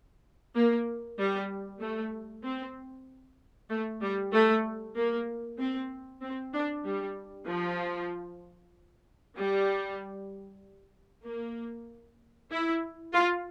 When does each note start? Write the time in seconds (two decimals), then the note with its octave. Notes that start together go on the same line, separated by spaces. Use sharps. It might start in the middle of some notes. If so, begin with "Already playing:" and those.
0.55 A#3
1.18 G3
1.81 A3
2.44 C4
3.69 A3
4.02 G3
4.32 A3
4.96 A#3
5.59 C4
6.22 C4
6.53 D4
6.85 G3
7.47 F3
9.37 G3
11.24 A#3
12.51 E4
13.13 F4